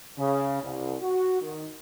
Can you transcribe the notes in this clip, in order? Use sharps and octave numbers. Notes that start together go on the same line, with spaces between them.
C#3
C2
F#4
D#3